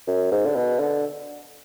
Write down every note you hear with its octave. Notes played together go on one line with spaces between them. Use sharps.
F#2
G#2
D3
B2
D3